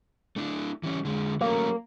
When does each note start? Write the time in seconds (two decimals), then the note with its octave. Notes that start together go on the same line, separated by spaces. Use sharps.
0.36 A3 D4 E4
0.83 E3 G3 C#4
1.05 D3 G#3
1.41 F#3 A3 A#3 C#4